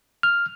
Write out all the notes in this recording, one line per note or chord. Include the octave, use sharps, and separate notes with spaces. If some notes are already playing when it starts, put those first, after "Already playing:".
F6